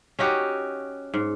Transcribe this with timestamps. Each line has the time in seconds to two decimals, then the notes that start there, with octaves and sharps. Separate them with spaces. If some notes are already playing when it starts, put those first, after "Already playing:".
0.19 C#4 D#4 F#4 G4
1.14 G#2